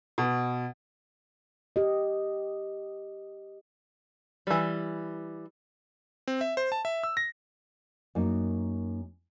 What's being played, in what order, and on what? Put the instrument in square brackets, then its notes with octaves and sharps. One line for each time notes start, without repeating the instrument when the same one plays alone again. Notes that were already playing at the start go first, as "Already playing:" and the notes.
[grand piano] B2
[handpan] G4 D#5
[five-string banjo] E3 G3
[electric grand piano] C4
E5
C5
A5
E5
E6
A#6
[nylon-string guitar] F#2 A#3 D#4